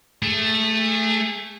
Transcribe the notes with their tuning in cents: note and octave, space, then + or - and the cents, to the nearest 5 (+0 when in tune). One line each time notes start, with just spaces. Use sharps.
A3 +0 G#4 -25